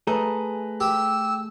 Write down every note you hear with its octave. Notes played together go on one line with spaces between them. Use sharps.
A3 G#4 A4 B4 A#5
G4 E6